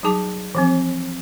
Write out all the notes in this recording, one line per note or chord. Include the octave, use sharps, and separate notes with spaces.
F#3 G3 D#4 G#4 A5 D6
E3 F3 C4